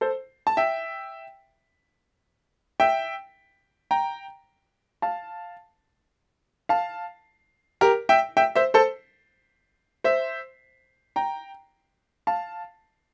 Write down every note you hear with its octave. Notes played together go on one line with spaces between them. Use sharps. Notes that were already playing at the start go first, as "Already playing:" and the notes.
A4 C5
A5
E5 G5
E5 G5
G5 A#5
F5 A5
F5 A5
G4 A#4
E5 G5
E5 G5
C5 E5
A4 C5
C5 E5
G5 A#5
F5 A5